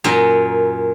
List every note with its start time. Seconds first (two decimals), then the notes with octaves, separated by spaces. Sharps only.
0.04 F#2 A#2 A#5